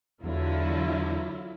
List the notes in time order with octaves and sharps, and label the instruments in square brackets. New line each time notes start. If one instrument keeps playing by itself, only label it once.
[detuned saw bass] E2 [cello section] D3 F#3 [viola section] E4 F4